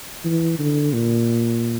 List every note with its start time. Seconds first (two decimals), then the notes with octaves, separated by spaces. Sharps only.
0.25 E3
0.59 D3
0.93 A#2